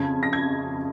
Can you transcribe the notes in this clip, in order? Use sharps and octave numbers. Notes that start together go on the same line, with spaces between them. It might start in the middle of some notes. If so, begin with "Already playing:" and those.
Already playing: F2 C#3 G#6
A#6
G#6